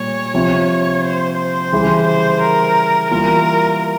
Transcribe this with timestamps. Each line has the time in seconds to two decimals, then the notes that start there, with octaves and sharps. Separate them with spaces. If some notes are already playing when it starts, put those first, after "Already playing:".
Already playing: A#2 G3 C#5
0.34 C3 F3 C4 F4
1.03 C5
1.38 C5
1.72 C#3 E3 G3
2.07 C5
2.41 A#4
3.10 E3 G3 A#3 F4 A#4